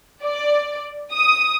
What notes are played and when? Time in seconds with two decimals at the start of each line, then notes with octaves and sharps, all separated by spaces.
0.22 D5
1.13 D#6